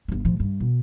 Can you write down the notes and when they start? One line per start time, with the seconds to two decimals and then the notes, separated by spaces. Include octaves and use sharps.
0.08 G1 A#3
0.25 A2 F3
0.40 G2
0.60 B2